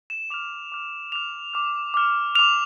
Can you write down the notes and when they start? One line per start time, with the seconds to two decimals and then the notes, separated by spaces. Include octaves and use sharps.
0.10 E7
0.30 D6 F6 F7
0.72 D6 F6
1.12 D6 F6 F7
1.54 D6 F6
1.94 D6 F6
2.35 D6 F6 F7